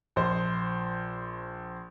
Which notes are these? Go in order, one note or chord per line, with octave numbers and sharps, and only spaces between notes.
A#1 C5